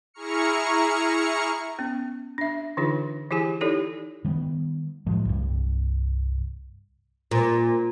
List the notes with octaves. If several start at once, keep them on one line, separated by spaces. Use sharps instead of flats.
E4 G#4 A#5 C#6 F6 C#7
B3 C#4
D4 E5
D3 E3 D4 D#4 F4 G#4
E3 E4 G4 G#4 G#5
D#4 E4 G4 A4 C#5 D5
D#3 G3 G#3 B3
A2 F3 F#3 G#3
C2 G2
A#2